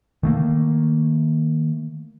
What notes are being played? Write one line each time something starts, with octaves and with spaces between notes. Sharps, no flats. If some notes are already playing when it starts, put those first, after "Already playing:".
D#3 A3 A#3